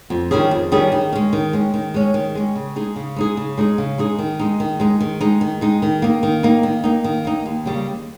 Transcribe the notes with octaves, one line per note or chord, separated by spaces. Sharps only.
F2
D#3 G3 C#4 G#4
F2
D#3 G3 C#4 G#4
D#3
G#3 C#4
D#3
G#3 C#4
D#3
G#3 C#4
D#3
G#3 C#4
C#3
G#3 D#4 G#4
C#3
G#3 D#4 G#4
C#3
G#3 D#4 G#4
C#3
G#3 D#4 G#4
D#3
G#3 D#4
D#3
G#3 D#4
D#3
G#3 D#4
D#3
G#3 D#4
D#3
A#3 D#4
D#3
A#3 D#4
D#3
A#3 D#4
D#3
A#3 D#4
D#2
C#3 G3 A#3
D#2